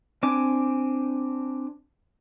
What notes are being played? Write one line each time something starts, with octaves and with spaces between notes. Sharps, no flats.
C4 D4 G#5 D6